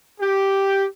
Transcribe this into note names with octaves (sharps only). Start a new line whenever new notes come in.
G4